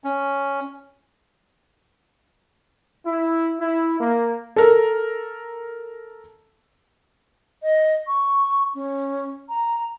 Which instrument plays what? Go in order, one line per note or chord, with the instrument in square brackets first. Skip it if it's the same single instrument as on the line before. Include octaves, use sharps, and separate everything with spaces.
[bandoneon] C#4
[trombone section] E4
E4
A#3
[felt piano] A4 A#4
[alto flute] D#5
C#6
C#4
A#5